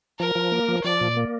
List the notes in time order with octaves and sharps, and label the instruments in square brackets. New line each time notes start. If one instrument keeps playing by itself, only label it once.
[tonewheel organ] F3 [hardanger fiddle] A#4
[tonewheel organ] F3
A#3
F3
[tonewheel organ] F3 [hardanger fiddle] D5
[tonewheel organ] A#2
A#3